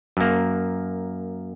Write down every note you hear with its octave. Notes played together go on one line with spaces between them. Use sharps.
F#2 A#3